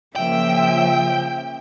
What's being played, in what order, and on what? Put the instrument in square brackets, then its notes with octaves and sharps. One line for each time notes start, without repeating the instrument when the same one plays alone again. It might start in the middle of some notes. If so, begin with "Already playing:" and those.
[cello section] C#3 F3 [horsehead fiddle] A#3 E5 [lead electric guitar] G5